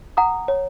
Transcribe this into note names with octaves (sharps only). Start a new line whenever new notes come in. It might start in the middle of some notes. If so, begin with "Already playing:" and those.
F#5 A#5 D#6
C#5